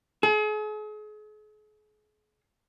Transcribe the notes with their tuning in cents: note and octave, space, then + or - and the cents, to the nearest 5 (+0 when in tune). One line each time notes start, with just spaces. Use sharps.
G#4 +40